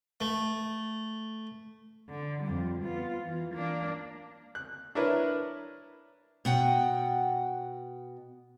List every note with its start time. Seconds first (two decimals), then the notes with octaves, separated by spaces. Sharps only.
0.21 A3
2.09 D3
2.43 F2 G3
2.83 B3 F4
3.21 E3
3.55 A#3 D4
4.55 F#6
4.95 D4 E4 A#4 B4 C#5
6.45 B2 F#5 G5